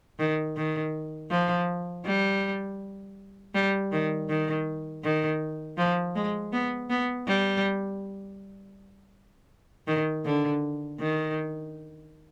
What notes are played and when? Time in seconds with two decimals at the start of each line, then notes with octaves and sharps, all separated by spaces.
0.19 D#3
0.57 D#3
1.31 F3
2.05 G3
3.55 G3
3.92 D#3
4.29 D#3
5.04 D#3
5.78 F3
6.15 G#3
6.53 B3
6.90 B3
7.27 G3
9.87 D#3
10.25 D3
11.00 D#3